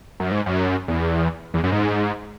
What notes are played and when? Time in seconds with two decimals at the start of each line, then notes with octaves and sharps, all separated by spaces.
0.20 F#2
0.31 G#2
0.46 F#2
0.88 E2
1.54 E2
1.64 F#2
1.72 G#2